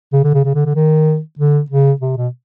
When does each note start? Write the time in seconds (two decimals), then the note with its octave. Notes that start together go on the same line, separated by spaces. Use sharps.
0.13 C#3
0.24 D3
0.34 C#3
0.45 C#3
0.55 D3
0.66 D3
0.75 D#3
1.39 D3
1.70 C#3
2.01 C3
2.17 B2